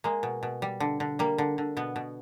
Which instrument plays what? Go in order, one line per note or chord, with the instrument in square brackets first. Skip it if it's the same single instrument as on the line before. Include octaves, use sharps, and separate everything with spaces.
[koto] G#3 A#3
B2
B2
G3
D3
D3
G3 A#3
D3
D3
B2 B3
B2